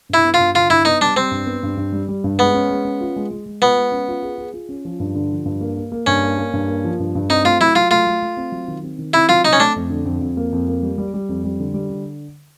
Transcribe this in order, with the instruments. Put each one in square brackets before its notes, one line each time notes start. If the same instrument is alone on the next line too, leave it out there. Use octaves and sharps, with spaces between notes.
[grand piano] G2 [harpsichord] E4
[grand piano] B3
[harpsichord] F4
[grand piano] G2
[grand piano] D3 [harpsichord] F4
[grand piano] G2 [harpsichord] E4
[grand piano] B3 [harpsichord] D#4
[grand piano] G3 [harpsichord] D4
[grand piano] G3 [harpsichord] C4
[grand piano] G2
B3
G2
G2
G3
G3
G2
[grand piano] G#3 [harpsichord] B3
[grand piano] C#4
G#3
C#4
F4
G#3
G#3
G#3
[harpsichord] B3 [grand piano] F4
[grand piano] G#3
C#4
F4
G#4
G#4
F4
C#4
F3
G2
D3
F3
G2
A#3
A#3
A#3
[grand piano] G2 [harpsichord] C#4
[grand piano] A#3
A#3
G2
A#3
F3
G2
G2
[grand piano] C4 [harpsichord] D#4
[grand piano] A3 [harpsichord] F4
[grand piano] F#3 [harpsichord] E4
[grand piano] F#3 [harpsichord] F4
[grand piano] A3 [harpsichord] F4
[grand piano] A3
A3
C4
F#3
D#3
C4
D#3
[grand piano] C4 [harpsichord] E4
[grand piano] F#3 [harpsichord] F4
[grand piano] C4 [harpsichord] D#4
[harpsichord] C#4
[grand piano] A3 [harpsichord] D4
[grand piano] F2
D3
F2
F2
A#3
F2
A#3
G3
G3
G3
F2
G3
D3
G3
D3